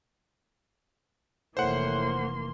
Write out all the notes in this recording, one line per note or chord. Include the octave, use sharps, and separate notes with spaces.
F1 A2 E3 A#3 C5 F#5 C6